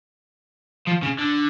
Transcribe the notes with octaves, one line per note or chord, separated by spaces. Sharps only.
F3
C#3
D3